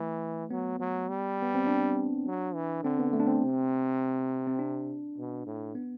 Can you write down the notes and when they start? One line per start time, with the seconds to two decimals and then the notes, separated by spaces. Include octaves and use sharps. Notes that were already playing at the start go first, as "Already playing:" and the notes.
Already playing: E3 A3
0.51 F#3 B3
0.80 F#3
1.09 G3
1.42 B3
1.55 C4
1.67 D4
2.26 F#3
2.54 E3
2.83 D3 C4
2.99 B3
3.13 A3
3.20 D4
3.27 C4
3.42 C3
4.47 C4
4.59 D4
5.17 B2
5.46 A2
5.75 B3